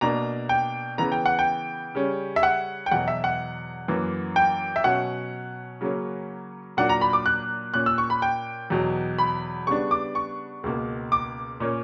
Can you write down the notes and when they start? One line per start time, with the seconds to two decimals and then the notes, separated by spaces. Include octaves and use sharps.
0.01 B2 A#3 D4 A#5
0.49 G5
0.98 C#3 E3 B3 A#5
1.12 G5
1.26 F#5
1.39 G5
1.95 C#3 G3 C#4
2.36 E5
2.43 F#5
2.86 G5
2.91 E2 B2 F#3 F#5
3.08 E5
3.24 F#5
3.88 F#2 E3 A#3
4.36 G5
4.76 E5
4.84 B2 F#3 C#4 F#5
5.81 C#3 F#3 A#3 C#4
6.77 A#2 F#3 A#3 D4 F#5
6.89 A#5
7.01 B5
7.13 D6
7.26 F#6
7.74 A#2 A#3 C#4 F#6
7.86 E6
7.98 C#6
8.10 B5
8.22 G5
8.70 E2 B2 F#3
9.18 B5
9.67 C#3 G3 B3 D4 C#6
9.91 D6
10.15 C#6
10.63 C#2 B2 A#3
11.12 D6
11.60 A#2 A#3 C#4